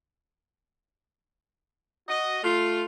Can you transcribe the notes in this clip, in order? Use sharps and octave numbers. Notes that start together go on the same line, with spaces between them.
F#4 D#5
A3 F4